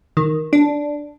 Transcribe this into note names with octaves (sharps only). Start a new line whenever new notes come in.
D#3
D4